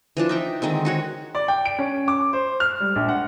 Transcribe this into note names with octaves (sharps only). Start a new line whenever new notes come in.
E3 F3 D4
D#4 E5 G5
D3 D#3 G#3 C4
D#4 F#4 C#5
D5
G5
D7
C#4
D6
C5
F6
G3
A#1
F#5